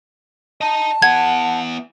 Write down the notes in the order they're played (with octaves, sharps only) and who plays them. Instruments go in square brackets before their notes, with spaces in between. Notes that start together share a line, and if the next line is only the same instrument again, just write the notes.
[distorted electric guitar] D#5 A#5 [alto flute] A5
[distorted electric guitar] B3 E4 [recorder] F#5 [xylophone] G#6